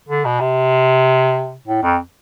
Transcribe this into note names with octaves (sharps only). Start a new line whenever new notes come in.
D3
B2
C3
A2
F2